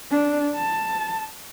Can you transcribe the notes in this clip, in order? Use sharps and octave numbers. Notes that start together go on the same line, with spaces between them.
D4
A5